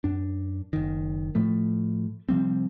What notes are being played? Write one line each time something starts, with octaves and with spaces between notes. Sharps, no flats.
F#2 D4
F#1 D#3
A2 F3 A3
C3 F3 G3 C4